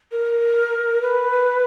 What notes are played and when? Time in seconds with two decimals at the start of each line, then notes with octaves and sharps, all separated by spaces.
0.11 A#4
1.01 B4